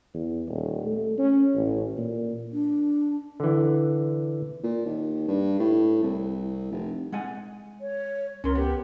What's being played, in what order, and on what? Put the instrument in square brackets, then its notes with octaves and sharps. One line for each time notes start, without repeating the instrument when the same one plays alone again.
[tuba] E2
D#1
A3
C#4
A1
A#2
[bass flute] D4
[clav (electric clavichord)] D3 E3
[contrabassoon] A#2
D#2
G2
A2
C2
F1
[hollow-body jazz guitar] G#3 F#5 G#5
[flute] C#5
[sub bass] C#2 [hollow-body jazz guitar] C#4 C6 [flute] A#4
[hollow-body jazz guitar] B3 [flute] G4